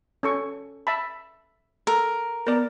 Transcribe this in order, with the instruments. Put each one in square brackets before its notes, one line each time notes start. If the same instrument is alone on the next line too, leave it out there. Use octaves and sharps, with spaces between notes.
[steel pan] C#4 A4 C#6
E5 A5 B5
[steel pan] A4 [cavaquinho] A#4
[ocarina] B3 [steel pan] A#4 D5